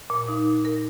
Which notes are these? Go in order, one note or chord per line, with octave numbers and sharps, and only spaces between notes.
A#2
D#4
A#4